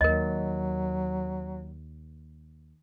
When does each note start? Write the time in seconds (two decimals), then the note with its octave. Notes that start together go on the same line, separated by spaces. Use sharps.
0.01 D#2 F#3 A#4 D#5